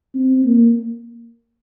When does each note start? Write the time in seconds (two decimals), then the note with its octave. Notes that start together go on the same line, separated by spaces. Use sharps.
0.15 C4
0.45 A#3